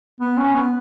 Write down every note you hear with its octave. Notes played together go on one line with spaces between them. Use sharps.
B3
C#4
B3